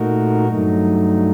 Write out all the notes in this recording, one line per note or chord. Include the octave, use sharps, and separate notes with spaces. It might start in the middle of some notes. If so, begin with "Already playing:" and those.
Already playing: A#2 A3 D#4 F#4 A#4
G2 F#3 A3 D#4